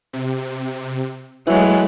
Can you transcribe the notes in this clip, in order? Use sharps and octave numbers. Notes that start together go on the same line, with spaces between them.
C3
E3 F#3 G#3 A3 F#6